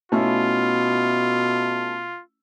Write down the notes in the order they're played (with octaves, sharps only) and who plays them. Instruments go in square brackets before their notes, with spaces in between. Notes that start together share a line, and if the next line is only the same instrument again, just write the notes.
[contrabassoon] B2 [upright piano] A3 C#4 E4 [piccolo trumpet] F4